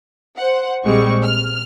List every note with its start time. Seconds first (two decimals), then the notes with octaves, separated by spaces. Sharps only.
0.36 C5 F#5
0.84 A#1 G3 G#3 C4 C#6
1.23 F6